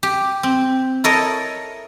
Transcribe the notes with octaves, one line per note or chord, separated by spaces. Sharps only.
G4
C4
E4 A4 A#4 C#5 D#5